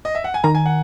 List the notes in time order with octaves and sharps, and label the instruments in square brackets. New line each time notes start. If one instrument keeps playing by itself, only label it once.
[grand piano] D#5
E5
F#5
G#5
[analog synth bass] D#3 [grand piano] A#5
[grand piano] G#5
F#5